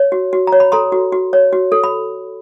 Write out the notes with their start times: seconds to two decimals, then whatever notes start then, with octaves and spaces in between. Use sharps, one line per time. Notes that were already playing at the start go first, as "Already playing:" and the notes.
Already playing: C#5
0.12 F#4
0.33 F#4
0.47 A#5
0.53 C#5
0.60 B5
0.72 A4 A#5 C6
0.92 F#4
1.12 F#4
1.33 C#5
1.53 F#4
1.72 A4
1.84 B5